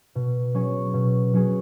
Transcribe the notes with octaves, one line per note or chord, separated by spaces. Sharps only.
B2
F#3 C#4 G#4
B2
F#3 C#4 G#4